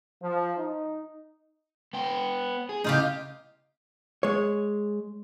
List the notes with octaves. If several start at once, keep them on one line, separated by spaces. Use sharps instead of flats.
F3
D#4
B3 G5
G#4
A2 C#3 D#4 F4 G4
G#3 C#5